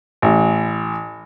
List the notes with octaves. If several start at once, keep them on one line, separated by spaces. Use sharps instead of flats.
A1